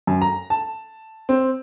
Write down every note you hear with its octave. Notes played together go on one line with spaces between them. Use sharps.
F#2
A#5
A5
C4